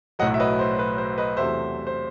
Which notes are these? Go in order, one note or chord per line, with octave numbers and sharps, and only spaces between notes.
B1 A2 F#3 D#5 F#5
E5
B4 D#5
C5
B4
C5
B4 D#5
E2 C3 F#3 A3 C5 E5
C5